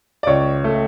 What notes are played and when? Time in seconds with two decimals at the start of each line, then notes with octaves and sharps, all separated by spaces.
0.23 D5
0.26 C#2 C#5
0.64 A3